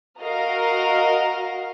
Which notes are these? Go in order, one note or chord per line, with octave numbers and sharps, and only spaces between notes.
F#4 A#4 D#5 F5 A#5 F6